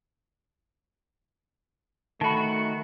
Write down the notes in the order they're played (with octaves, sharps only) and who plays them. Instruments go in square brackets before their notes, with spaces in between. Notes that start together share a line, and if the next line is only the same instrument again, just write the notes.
[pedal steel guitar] D#3 F#4 [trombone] A3 [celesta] A5 B5